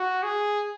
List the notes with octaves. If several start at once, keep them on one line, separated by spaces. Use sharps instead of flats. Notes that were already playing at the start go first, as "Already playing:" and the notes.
Already playing: F#4
G#4